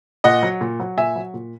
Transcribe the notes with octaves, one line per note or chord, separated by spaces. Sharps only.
A#2 D#5 F#5
F#3
A#2
F#3
A#2 E5 G#5
F#3
A#2